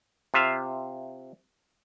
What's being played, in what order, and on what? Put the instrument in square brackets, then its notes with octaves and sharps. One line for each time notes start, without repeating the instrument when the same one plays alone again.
[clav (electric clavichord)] C3 F4 E5 F5